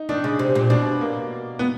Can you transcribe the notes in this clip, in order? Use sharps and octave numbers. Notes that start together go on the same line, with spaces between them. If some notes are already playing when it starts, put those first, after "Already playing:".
Already playing: D#4
D#3 D4
C#3
C3
A#2
B2 D4
A#3
B3